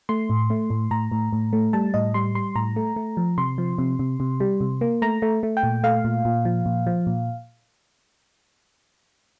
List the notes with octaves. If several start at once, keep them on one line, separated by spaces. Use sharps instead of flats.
A3 C6
A2
A3
A2
A2 A#5
A2
A2
A3
G3 A5
A2 D#5
G3 C6
G3 C6
A2 A#5
A3
A3
F3
C3 C6
F3
C3
C3
C3
G3
C3
A#3
A3 A#5
A3
A3
G5
A#2
A3 F5
A#2
A#2
F3
A#2
F3
A#2